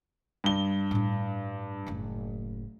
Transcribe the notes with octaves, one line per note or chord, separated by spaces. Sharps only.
G2 G7
A2 D4
F#1 A2